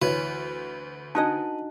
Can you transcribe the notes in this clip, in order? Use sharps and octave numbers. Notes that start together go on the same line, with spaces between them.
D2 E3 B4 C#5
D4 D#4 F#4 D#5 A5